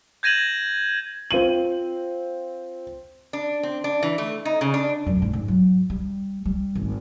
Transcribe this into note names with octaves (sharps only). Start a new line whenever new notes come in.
G6 G#6 A#6 D#7 E7 F#7
C4 F4 D#7 F#7
D4
C4
D4
E3
A3
D#4
C#3
D4
F#2
G#2
G#2
F#3
G3
G3
G#1